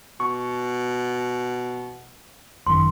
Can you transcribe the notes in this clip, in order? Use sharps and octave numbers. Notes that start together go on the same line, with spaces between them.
B2 C#6
G#1 F#2 D#3 C6